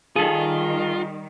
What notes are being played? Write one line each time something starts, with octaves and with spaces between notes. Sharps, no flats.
D#3 G3 F4 G#4 A4